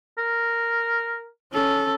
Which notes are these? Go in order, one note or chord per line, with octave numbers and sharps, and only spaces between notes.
A#4
C#4 A4